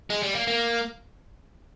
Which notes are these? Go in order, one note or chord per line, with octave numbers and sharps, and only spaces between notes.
G#3
G3
A#3
A#3